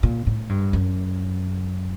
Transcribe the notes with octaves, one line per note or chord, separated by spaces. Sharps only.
A#2
A2
G2
F#2